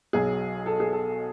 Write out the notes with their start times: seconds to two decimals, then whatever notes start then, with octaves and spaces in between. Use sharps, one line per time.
0.13 B1 B2 F#3 G#4
0.66 A4
0.80 G#4
0.93 A4